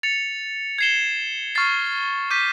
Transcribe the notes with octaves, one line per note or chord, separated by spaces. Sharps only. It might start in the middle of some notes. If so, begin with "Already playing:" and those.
A6 C#7 F7
G#6 C7 E7 G7
C#6 F6 A6 C7
D6 G6 B6 D#7